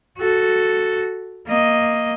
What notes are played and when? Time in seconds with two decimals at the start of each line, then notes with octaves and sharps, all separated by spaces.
0.18 F#4 A4
1.46 A#3 D#5